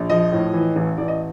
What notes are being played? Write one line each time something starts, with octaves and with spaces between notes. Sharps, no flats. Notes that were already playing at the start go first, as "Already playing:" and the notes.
Already playing: A#1
F3 D#5
A2
E3
A1
A1 D5
D#5